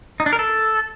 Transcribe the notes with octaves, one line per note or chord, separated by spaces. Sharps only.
D#4
D4
A#4
A4